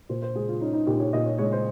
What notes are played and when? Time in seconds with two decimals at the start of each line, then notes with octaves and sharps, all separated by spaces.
0.09 A#2 C5
0.22 C5
0.35 G#3 G#4
0.48 F4
0.61 C#4 D#4
0.73 D#4
0.87 A#2 G4
1.00 C#5
1.13 A#2 D#5
1.26 C#5
1.38 G#3 C#5
1.52 C5